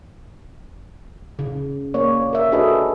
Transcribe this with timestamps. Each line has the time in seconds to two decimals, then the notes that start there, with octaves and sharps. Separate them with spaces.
1.39 C#3
1.94 A#3 C#5 D5
2.33 A#4 E5
2.52 D4 F#4 G#4 A4 B4 D#5